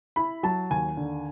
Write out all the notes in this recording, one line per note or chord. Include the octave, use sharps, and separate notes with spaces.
E4 B5
F#3 A5
D#2 G#5
D3